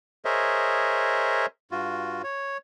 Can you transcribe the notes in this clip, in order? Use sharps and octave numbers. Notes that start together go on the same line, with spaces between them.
G#4 A#4 C5 C#5 D#5 E5
G2 F4 F#4
C#5